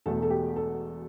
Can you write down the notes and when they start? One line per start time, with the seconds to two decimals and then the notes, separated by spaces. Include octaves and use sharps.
0.06 E1 E2 B2 A3 A4
0.22 A4
0.30 G4
0.56 A4